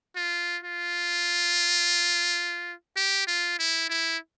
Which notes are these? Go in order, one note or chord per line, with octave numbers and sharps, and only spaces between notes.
F4
F4
G4
F4
E4
E4